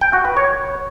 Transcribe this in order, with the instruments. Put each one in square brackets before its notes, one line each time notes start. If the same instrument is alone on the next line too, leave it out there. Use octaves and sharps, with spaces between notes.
[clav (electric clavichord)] G5
F#4
B4
C#5